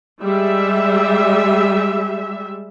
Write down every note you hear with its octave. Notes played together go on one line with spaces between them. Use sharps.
G3 G#3 E5